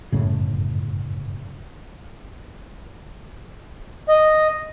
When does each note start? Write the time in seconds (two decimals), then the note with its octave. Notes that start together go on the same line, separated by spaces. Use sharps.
0.12 G1 F#2 A2 C#3
4.09 D#5